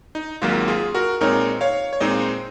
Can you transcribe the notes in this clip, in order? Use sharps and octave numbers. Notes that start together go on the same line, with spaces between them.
D#4
G#1 G#2 F#3 A#3 F4
F4 G#4
F#4 A#4
A#2 G#3 C4 D#4 A#4 C#5
C#5 F5
C#5
A#2 G#3 C4 D#4 C5 D#5